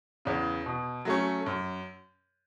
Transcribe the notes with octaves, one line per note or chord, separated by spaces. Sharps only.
E2 C#3
B2
F#3 A3 C#4
F#2